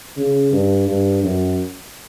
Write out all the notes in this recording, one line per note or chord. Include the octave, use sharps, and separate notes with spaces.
C#3
G2
G2
F#2